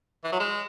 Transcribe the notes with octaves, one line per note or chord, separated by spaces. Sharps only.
E3
F#3
G#3